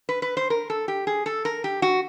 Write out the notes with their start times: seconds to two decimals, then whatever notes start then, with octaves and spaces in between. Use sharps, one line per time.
0.09 B4
0.22 B4
0.37 C5
0.50 A#4
0.70 A4
0.88 G4
1.07 G#4
1.26 A4
1.45 A#4
1.64 G4
1.82 F#4